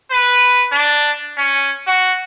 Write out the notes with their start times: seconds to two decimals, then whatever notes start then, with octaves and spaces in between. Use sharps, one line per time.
0.11 B4
0.72 D4
1.37 C#4
1.87 F#4